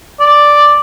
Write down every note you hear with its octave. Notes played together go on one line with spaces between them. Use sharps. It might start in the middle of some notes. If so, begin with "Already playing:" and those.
D5